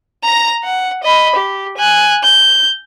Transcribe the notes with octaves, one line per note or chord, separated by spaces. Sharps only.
A#5 A#6
F#5
D#5 B5
G4
G#5 F#6
G6